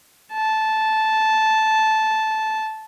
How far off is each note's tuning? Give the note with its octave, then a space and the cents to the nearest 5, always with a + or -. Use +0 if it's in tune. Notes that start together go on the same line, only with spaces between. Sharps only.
A5 -10